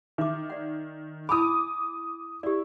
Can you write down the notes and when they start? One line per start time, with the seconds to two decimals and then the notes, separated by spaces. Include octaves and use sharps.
0.18 D#3 E5 D6
0.50 D5 F#5
1.29 E4 G#5 B5 D6 D#6
2.43 E4 G4 D5